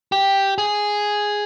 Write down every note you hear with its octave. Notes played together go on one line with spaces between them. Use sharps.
G4
G#4